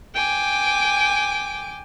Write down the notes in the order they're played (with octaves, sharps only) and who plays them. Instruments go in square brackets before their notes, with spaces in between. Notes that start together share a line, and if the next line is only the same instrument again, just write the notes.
[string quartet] G5 G#5 D6